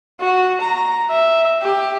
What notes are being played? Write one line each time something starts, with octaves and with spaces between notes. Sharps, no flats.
F#4
A#5
E5
G4